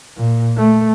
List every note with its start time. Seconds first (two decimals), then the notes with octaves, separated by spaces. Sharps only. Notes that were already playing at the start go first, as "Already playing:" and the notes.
0.17 A#2
0.57 A3